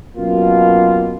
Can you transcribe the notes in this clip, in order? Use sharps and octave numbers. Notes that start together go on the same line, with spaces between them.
F#2 B2 A#3 F4